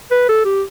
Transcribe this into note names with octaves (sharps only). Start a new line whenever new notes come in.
B4
A4
G4